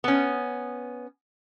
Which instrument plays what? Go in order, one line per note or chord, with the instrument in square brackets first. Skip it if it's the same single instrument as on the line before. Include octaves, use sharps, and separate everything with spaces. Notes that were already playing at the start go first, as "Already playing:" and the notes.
[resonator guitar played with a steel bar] B3 C#4